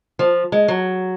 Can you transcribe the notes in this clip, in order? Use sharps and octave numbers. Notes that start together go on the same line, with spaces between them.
F3
G#3
F#3